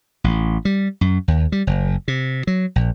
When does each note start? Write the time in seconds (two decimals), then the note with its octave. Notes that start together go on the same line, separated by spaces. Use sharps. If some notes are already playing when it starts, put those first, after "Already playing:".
0.24 A1
0.65 G3
1.01 F#2
1.28 D#2
1.52 G3
1.67 F#1
2.08 C3
2.47 F#3
2.76 A#1